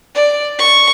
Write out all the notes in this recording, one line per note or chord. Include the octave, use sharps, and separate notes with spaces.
D5
C#6